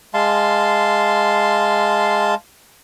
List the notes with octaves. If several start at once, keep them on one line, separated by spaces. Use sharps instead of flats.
G#3 F5 A5 C6